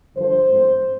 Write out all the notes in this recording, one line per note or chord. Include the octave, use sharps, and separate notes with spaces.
G2 D3 F3 C5
G#2 F3 A3 C4